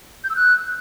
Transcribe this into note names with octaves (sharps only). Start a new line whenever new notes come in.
G6
E6
F#6